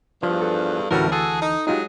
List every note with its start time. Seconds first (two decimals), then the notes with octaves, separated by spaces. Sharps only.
0.23 E2 G2 F3
0.41 A4
0.91 D2 A2 E3 G3 C#4 F#4 A4 A#4
1.12 F#4 G#4 A4
1.41 D#4
1.67 F#3 G#3 D#4 F4 G4 G#4